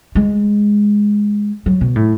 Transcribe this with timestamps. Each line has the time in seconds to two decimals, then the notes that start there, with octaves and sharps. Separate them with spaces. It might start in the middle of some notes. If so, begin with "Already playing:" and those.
0.15 G#3
1.66 F#3
1.81 B2
1.96 A2